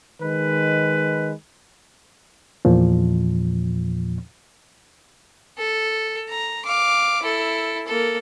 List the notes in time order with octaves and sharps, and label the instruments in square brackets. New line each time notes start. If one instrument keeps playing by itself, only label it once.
[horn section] D#3 G#3 B4
[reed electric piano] E2 A#2 F3
[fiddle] A4
A#5
F5 D6
E4 A4
A#3 A4